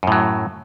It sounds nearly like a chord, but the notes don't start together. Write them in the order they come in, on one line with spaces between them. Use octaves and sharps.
F#2 A2 F#3